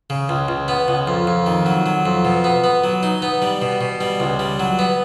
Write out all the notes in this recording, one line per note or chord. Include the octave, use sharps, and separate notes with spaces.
C#3
C#2
C#2
B3
C#2
F2
F2
D#3
F#3
F#3
F2
B2
B3
B3
F#3
D#4
B3
G3
B2
B2
G3
C#2
G3
F#3
B3